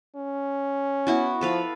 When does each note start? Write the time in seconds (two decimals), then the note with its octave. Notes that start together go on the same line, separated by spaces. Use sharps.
0.16 C#4
1.07 B3 E4 F#4
1.41 F3 A4 B4 F5